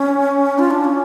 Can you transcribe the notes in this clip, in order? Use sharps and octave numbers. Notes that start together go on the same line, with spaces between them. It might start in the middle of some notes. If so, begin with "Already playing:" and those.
Already playing: C#4
F4
D4
C#4